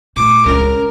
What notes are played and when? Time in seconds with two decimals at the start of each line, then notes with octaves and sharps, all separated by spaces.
0.16 A#2 A3 D6
0.46 C#2 C#4 A#4